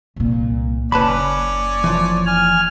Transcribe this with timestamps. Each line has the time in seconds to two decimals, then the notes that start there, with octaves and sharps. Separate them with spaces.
0.16 C2 A#2
0.92 F#1 C#4 B4 C#5 D5 A5 B5
1.84 E3 F3
2.26 G#5 F6